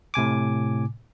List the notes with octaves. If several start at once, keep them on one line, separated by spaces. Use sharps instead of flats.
A2 C3 G#5 D6